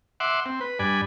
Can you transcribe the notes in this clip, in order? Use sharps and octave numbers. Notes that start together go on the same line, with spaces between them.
E5 F#5 C6 D6
C4
B4
G2 D5 G#5 B5